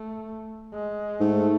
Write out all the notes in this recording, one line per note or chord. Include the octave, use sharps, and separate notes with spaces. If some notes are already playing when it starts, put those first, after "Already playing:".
Already playing: A3
G#3
G#2 A3